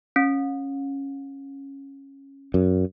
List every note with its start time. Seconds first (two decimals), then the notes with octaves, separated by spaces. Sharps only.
0.16 C#4
2.54 F#2